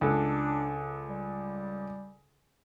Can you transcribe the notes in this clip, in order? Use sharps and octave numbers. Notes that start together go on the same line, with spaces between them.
C#2 D4 A4
G3